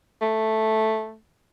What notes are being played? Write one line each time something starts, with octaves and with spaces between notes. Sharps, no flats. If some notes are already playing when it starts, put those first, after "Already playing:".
A3